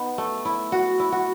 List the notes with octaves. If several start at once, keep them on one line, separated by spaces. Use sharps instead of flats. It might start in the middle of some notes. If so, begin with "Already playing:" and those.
Already playing: B3 D#4
A3
E4
F#4
E4
F#4